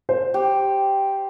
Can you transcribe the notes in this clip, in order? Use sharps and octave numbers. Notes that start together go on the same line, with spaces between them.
C5
G4